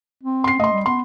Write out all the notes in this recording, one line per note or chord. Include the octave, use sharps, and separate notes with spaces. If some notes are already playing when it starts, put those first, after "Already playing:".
C4
C6 C7
A3 D#5 C6
G3
B3 C6